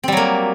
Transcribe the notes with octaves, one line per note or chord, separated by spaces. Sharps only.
F#3 G3 A#3 C4